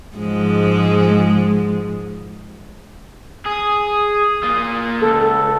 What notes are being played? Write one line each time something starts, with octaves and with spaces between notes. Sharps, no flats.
G#2 F3 G#3
G#4 D#6
A#3 F4
C#2 A4